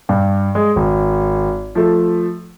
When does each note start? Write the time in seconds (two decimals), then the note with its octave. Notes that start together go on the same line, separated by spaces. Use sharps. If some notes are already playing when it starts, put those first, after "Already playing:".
0.09 G2
0.55 G#3
0.76 G#1
1.75 F3 A3